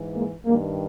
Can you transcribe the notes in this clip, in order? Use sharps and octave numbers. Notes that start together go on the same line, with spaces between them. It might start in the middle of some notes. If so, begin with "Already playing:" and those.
Already playing: G#2 E3
G#3 A#3
G2 D#3 G#3 A#3